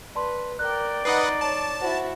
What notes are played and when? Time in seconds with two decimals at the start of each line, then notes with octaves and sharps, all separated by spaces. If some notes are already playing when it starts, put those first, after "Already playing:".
0.15 B4 D5 A5 C6
0.59 A#4 D5 G5 F#6
1.05 D#4 B4 D#5 F#5 C7
1.41 C#5 A5
1.82 E4 F#4 C5 F#5